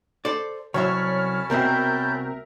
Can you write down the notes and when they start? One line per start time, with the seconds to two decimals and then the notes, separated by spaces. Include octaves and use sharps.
0.25 A4 C5 D5
0.74 C2 F#3 C#4 C#5 E5 A5 B5 F6
1.50 C2 B2 C4 A#4 E5 G6